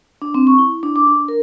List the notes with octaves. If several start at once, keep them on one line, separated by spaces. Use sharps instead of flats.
D4
C4
C#6
E4
D4
D6
D4
A#4